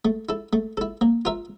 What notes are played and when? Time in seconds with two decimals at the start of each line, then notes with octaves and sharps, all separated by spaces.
0.05 A3
0.29 E4 A4
0.53 A3
0.77 E4 A4
1.01 A#3
1.25 F4 A#4 E5